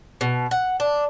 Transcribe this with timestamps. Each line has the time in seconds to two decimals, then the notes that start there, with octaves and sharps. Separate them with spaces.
0.21 B2
0.51 F#5
0.80 D4